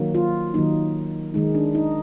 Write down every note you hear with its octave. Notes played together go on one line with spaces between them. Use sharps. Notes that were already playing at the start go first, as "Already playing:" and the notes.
Already playing: D#3 F#3 A#3
F4
D#3 F#3 A#3 D#4
D#3 G#3 D#4
D4
D#4